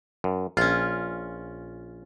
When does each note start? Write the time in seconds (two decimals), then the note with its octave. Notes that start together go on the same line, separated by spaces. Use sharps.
0.24 F#2
0.57 A#1 C#4 F4